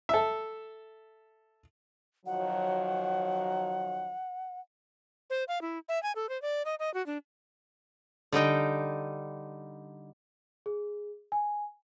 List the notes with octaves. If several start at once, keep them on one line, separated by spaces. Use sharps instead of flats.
A4 E5
D#3 F3 F#3 F#5
C5
F5
E4
E5
G#5
A4
C5
D5
D#5
D#5
F#4
D4
D3 G3 D#4 G5
G#4
G#5